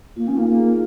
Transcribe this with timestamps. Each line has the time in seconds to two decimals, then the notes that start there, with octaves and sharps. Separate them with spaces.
0.16 A#3 F4
0.25 C#4 D#4
0.33 A#3 F4
0.48 A#3 G#4